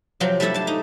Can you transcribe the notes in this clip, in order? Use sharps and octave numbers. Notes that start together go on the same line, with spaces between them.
C3 F3 F#3 C4 G5
G3 A3 D4 E4 A4 E5
D4 A5
D#4